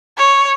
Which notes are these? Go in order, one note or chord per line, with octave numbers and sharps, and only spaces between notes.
C#5